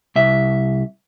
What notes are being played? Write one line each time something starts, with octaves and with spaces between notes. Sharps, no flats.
C2 E5